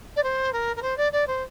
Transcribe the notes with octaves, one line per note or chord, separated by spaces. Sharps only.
D5
C5
A#4
A#4
C5
D5
D5
C5